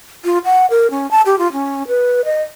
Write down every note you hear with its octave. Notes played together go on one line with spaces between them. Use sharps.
F4
F#5
A#4
C#4
A5
G4
F4
C#4
B4
D#5